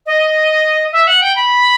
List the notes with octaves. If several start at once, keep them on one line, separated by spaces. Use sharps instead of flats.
D#5
E5
F#5
G5
B5